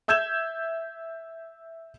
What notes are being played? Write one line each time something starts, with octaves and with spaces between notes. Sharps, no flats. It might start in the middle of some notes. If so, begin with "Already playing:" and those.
E5 E6 G6 G#6 E7